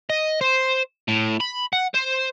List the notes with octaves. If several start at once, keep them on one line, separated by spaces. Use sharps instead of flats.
D#5
C5
A2
B5
F#5
C5